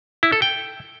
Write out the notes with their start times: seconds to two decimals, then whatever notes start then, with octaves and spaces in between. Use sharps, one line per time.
0.23 E4
0.32 A4
0.42 G5